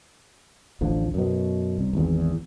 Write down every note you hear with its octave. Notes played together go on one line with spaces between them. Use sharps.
A1 D2 D3 F3
F#2 B2
C2
G#1 E2